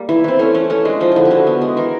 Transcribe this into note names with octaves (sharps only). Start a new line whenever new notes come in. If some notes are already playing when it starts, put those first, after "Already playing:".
Already playing: G3 A#3
E3 E4
E3 C4
A3 C#4
E3 C#4
A3 C#4
G#3 D4
F3 D#4
D3 E4 F4
G4
D3 F#4
B3
G#3
E3 A#4